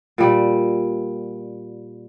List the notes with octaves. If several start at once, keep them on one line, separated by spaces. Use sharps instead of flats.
A#2 G3